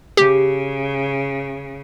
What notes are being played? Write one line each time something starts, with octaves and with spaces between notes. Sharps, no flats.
C#3 G4